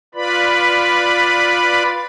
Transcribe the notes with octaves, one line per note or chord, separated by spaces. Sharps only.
F4 B4 D5 B5